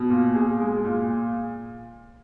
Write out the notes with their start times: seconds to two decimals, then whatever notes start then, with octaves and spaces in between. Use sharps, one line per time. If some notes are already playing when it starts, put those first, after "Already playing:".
Already playing: B2
0.10 A#2
0.35 G#4
0.60 G#3
0.85 A#2